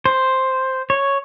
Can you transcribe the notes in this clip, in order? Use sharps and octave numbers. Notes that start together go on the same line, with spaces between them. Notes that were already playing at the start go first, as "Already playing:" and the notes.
C5
C#5